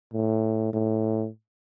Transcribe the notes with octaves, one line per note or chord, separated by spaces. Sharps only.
A2
A2